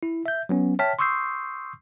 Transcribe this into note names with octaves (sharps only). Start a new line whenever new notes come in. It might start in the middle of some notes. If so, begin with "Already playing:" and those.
E4
E5 G6
F#3 B3 C#4
C#5 E5 G5 A5 F6 B6
C6 C#6 D#6 E6 G6 C7